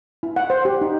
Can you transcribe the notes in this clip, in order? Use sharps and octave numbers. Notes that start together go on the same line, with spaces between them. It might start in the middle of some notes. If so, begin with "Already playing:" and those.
E4
F#5
C5
G4
D#4